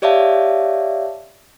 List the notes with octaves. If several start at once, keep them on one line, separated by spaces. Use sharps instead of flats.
G4 C#5 D5 E5 F5 A5